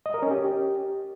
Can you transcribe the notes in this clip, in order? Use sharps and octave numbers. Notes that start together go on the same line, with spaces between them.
D#5
A#4
C#4
G4